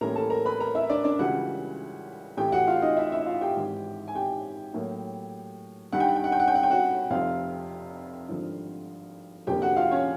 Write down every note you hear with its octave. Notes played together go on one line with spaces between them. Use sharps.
A2 E3 G3 A#3 C#4 A#4 A#5
A4 A5
A#4 A#5
B4 B5
A#4 A#5
E4 E5
D4 D5
D4 D5
C#2 C#3 E3 G3 F#4 F#5
A1 A2 E3 G4 G5
F#4 F#5
F4 F5
D#4 D#5
E4 E5
E4 E5
F4 F5
G4 G5
G#1 G#2 E3
G#5
G4 G5
A2 F#3 A#3
G2 D#3 G3 F#5
G5
F#5
G5
F#5
G5
F#5
G5
F#5
G5
F#4 F#5
F1 F2 C3 F4 F5
G#1 G2 D3 F3
F1 F2 D3 F3 A#3 G4 G5
F#4 F#5
F4 F5
C#4 C#5